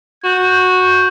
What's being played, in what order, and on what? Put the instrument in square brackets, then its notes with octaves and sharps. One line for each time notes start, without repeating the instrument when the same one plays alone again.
[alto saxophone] F#4 [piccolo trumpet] G6